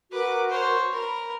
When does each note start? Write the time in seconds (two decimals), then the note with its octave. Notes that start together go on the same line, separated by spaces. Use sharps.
0.11 F#4 A#4 B4 D6
0.49 C5 C#5
0.92 A#4 B5